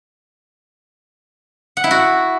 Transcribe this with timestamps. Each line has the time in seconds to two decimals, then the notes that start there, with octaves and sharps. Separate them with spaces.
1.77 F#5
1.84 E4
1.91 F#4